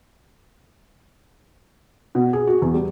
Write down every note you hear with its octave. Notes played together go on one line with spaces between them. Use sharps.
B2
G#4
F#4
E2
G3